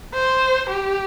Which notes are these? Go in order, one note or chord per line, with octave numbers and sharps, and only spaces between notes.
C5
G4